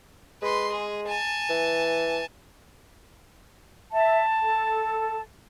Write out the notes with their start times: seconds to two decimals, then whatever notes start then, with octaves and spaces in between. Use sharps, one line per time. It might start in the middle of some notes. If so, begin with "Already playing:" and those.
0.42 G#3 B4 C6
0.72 G#4
1.07 G#5 A5
1.49 E3
3.92 E5 A5
4.42 A4